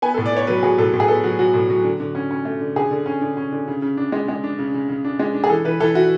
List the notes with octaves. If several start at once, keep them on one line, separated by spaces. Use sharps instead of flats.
B3 G#5
A2 A4
D5
B3 C#5
F#3 B4
F#3 G#4
A2 A4
A2
G#4
B3 A4
F#3 F#4
F#3 F#4
A2
F#3
D3
D3
C#4
C#4
A3
D3
D3 G#4
D3
C#4
D3
C#4
D3
C#3
C#3
D4
G#3
G#3
D4
C#3
C#3
C#3
D4
G#3
D4
G#4
E3 A4
E3 B4
E3 A4
E4 F#4